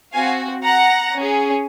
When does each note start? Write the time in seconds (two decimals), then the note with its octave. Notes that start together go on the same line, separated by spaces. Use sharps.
0.13 C4 F#4 F5 G#5
0.64 F#5 A#5
1.15 C#4 G#4